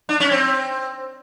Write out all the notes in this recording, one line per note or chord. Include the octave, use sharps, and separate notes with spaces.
D4
C#4
C4